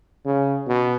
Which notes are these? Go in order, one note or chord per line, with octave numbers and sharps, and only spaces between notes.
C#3
B2